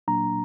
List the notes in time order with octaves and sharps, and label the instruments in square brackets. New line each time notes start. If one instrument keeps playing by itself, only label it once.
[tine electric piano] A#2 F#3 A#3 D4 A#5